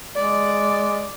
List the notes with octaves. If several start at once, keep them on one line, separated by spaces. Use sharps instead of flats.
G#3 D5